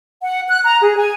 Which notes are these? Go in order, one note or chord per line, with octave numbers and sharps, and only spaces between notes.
F#5
F#6
A#5
G#4
G#5